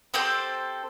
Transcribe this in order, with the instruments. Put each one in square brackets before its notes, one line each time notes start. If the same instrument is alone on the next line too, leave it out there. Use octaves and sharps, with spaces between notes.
[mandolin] C4 G4 A4 C5